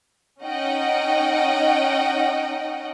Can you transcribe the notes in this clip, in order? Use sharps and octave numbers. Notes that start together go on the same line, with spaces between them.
C#4 D#4 D#5 F#5 G5